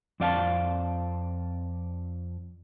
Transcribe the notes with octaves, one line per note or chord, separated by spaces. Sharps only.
F2 C4 D5 F5 G#5 A5